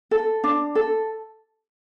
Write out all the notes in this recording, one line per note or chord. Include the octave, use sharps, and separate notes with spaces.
A4
D4
A4